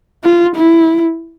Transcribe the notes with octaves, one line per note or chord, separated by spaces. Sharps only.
F4
E4